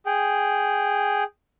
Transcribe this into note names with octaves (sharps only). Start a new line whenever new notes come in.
G#4 G5